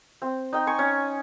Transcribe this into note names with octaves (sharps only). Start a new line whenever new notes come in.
C4
D#4 G5
G#5 C#6
C#4